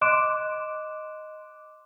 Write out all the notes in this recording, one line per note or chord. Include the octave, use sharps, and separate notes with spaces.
D#5 C6 D6 F#6 D7 E7